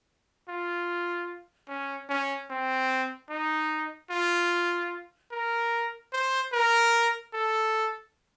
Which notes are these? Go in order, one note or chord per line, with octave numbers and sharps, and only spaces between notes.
F4
C#4
C#4
C4
D#4
F4
A#4
C5
A#4
A4